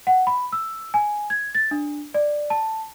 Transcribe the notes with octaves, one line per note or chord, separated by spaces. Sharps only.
F#5
B5
E6
G#5
G#6
A6
D4
D5
A5